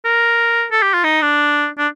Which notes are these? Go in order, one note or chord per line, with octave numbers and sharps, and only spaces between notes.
A#4
A4
G4
F4
D#4
D4
D4